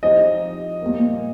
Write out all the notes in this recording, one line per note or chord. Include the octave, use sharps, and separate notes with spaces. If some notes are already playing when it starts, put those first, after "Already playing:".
F3 C4 D#4 G4 C5 D#5
A#2 G3 A#3